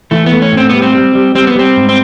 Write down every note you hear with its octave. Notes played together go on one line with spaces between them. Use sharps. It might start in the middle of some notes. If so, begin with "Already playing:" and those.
E3 A3
B3
A3
C#4
A2
C4
G3 B3
C4
G3
G3
G3 C4
B3
G3 C4
G#2
C4